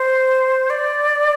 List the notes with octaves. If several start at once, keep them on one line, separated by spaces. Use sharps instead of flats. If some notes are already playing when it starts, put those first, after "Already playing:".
Already playing: C5
D5